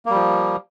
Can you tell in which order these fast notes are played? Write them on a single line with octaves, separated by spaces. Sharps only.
A#3 G3 F3